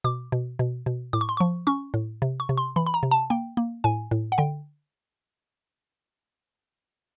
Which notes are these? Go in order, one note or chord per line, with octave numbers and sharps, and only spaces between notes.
B2 D6
B2
B2
B2
A2 D6
C#6
C6
F3 C#6
C#4 C#6
A2
C3
C#6
C3
C6
E3 B5
B5
A#5
C3
A5
A#3 G5
A#3
A2 G#5
A2
F#5
D3 G5